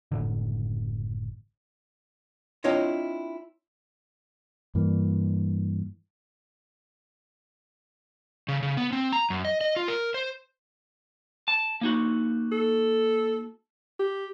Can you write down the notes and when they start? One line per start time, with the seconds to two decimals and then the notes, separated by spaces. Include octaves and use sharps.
0.12 F#1 A2 D3
2.64 C4 D4 E4 F4 C#5 D#5
4.75 G2 E3 A#3
8.48 C#3
8.63 C#3
8.77 B3
8.93 C4
9.13 A#5
9.30 F#2
9.45 D#5
9.61 D#5
9.76 F4
9.88 A#4
10.14 C5
11.48 A5
11.81 A#3 D#4 F#4
12.52 A4
14.00 G4